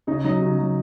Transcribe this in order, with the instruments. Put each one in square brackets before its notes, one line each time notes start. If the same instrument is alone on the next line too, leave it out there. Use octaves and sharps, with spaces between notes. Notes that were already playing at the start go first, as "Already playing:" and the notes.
[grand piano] C#3 D#4
F#3 D#4
C#3
F#3